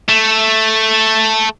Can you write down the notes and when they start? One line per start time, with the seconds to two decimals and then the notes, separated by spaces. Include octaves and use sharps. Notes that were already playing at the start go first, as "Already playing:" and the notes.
0.09 A3